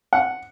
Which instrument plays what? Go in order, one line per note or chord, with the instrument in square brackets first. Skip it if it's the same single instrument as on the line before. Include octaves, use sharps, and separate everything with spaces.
[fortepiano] F#5